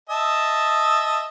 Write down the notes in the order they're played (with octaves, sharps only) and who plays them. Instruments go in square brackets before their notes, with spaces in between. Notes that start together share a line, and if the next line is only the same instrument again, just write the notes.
[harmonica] D#5 E5 A5